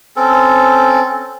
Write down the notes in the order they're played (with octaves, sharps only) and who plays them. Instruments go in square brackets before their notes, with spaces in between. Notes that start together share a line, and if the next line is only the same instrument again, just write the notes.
[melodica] C4 C#4 A4